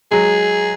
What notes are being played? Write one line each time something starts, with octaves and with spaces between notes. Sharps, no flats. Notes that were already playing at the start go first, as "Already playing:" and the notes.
F#3 G#3 G#4